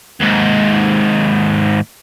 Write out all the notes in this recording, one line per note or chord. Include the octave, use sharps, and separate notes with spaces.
D#2 G#2